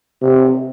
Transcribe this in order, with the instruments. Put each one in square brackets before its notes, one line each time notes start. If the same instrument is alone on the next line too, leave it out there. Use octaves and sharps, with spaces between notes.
[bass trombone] C3